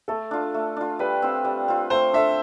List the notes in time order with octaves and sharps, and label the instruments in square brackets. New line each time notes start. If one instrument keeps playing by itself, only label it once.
[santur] A3 [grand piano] A4
[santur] D4 F4
A3
D4 F4
[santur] G3 [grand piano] B4
[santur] C4 F4
G3
C4 F4
[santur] A3 [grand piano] C5
[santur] D4 A4 [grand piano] E5